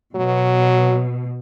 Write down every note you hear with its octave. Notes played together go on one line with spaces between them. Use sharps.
B2 F#3